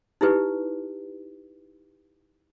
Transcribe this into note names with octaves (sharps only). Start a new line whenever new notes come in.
D#4 E4 G4 B4